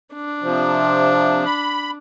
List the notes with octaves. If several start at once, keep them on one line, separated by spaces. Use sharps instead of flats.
D4
C3 F3
B5